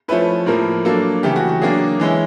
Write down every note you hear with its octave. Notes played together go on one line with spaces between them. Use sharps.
F3 A3 C#4 E4 B4
A2 F3 A#3 A#4
F#3 A#3 D4 A4
C#3 E3 A3 G4
F#4
F#4
F#3 A#3 D4 G#4
E3 G#3 C#4 E4